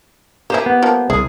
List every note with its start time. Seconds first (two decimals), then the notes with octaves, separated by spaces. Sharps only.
0.50 A#3 E4 G4 C5 G#5
0.66 B3
0.82 F3 G3 A#3
1.10 C2 E4 G#4